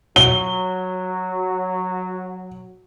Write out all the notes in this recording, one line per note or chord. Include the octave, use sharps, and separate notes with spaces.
F#3 G7